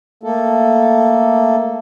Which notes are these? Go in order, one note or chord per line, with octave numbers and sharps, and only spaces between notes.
A3 A#3 A4